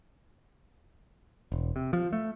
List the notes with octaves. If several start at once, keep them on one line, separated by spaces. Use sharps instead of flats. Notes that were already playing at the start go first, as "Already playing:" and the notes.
E1
C3
F3
A3